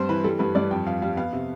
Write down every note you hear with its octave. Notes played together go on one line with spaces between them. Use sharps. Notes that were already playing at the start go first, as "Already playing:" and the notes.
Already playing: G2 C4 C5
E3 B4
G3 A4
G2 B4
G2 D5
F2 G5
F2 F5
G3 F5
B3 F5
C3